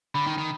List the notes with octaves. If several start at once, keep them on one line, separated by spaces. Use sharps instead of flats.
D3 B5
D#3
D#3